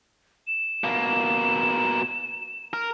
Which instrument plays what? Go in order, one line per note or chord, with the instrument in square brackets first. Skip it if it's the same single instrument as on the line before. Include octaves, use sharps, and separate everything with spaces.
[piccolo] E7
[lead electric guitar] B2 A#3
A#4